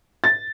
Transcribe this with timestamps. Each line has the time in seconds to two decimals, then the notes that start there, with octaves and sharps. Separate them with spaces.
0.24 A6